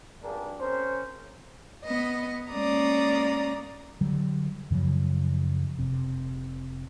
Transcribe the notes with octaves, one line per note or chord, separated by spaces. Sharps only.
G#1 G2 D4 G4 G#4 A#4
C4 C#4 G#4 A#4 C5
B3 D#5
G#3 A#3 C#4 D5 A#5 D#6
D3 F#3 G3
F#2 C#3 F3 F#3
F1 C3